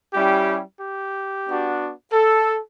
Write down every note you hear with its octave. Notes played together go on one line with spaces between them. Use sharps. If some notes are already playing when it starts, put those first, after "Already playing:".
G3 C#4 E4 G4
G4
B3 D4 F#4
A4